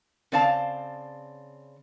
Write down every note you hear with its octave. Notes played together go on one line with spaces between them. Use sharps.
C#3 C4 D5 F5 A5